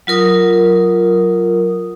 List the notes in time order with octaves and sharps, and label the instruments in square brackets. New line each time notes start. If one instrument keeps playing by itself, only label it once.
[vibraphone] F#3 F4 A#4 D#6